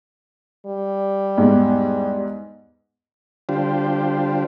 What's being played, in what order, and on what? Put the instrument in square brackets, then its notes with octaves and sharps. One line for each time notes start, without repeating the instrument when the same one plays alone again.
[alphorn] G3
[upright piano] E2 G#2
[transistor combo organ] D3 G3 D4 F4 G4 C5